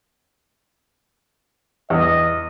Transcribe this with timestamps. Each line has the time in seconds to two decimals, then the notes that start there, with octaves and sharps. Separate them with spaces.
1.90 E2 D#5